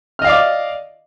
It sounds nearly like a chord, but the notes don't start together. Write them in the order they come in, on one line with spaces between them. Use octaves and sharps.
F6 D#5 F5 D5 D6